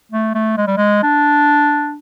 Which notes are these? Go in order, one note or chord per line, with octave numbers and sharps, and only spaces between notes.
A3
A3
G#3
G3
G#3
D4